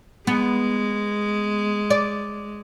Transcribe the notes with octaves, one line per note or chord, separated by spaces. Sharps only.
G#3 B3
D5